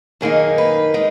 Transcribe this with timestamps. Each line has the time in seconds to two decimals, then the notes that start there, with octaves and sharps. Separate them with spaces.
0.21 F#2 D#3 A#3 D#4 G#4
0.58 B4
0.94 G#3 D#4